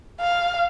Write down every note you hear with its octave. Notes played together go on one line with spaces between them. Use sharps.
F5